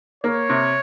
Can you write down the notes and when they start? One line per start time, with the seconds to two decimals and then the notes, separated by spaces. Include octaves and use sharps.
0.24 A#3 C#5
0.49 C3